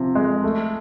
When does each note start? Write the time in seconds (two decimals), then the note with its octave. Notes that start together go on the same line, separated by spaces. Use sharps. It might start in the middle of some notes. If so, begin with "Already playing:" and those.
Already playing: C3 F3
0.15 G#3
0.44 A3